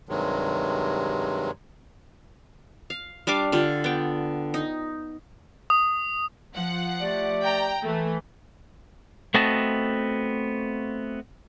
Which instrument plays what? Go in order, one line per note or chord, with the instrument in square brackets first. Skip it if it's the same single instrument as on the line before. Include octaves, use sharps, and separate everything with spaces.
[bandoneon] G2 C3 D#3 F#3 G#3
[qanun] F5
G3 D4 F5 D6
D3 F4 G4
B3 G5
D#4
[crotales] D#6
[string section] F3 F#5
[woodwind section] A3 G4 D5
[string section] G5 A#5
[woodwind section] E3 [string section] A3
[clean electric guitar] A3 B3 C4 F#4 D#5 A5